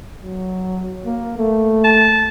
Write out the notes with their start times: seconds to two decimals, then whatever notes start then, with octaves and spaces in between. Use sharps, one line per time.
0.21 F#3
1.06 A#3
1.38 A3
1.84 A5